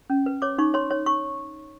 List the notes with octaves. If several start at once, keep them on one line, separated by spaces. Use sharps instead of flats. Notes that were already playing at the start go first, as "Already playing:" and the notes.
C#4
B4
C#5 D6
D#4 C#6
C#5 C6
C#5
C#6